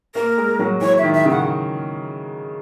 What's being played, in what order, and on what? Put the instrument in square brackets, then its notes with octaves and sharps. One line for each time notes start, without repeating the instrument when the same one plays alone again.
[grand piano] A#3 [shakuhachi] A#4
[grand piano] G#3
F#3
[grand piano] E3 [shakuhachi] C#5
[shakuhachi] E5
[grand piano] D#3
[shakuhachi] E5
[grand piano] C#3
[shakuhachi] F#5